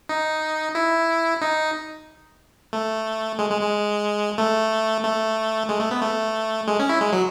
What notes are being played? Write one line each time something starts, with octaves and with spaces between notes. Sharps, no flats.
D#4
E4
D#4
A3
G#3
G#3
G#3
A3
A3
G#3
A3
B3
A3
G#3
C#4
E4
G#3
F#3